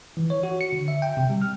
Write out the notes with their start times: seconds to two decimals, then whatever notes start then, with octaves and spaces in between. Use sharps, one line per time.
0.17 E3
0.30 C#5
0.43 F#4
0.61 C#7
0.73 D3
0.88 E5
1.02 G5
1.17 C3
1.30 G3
1.42 F6